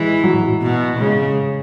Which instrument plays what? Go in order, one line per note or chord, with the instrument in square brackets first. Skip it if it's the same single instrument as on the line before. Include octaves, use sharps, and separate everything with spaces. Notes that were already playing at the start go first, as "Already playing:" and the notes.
Already playing: [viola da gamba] E3 [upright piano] G#3
[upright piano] F#3
[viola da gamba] B2
[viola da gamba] C#3 [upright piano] G#3